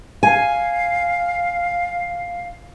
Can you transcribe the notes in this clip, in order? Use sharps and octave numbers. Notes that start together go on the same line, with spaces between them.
F5 G#5